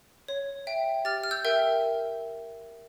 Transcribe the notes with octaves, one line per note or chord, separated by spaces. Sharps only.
C#5
E5 G5
G4 F6 A6
F6
E6 G6
A#4 E5 G5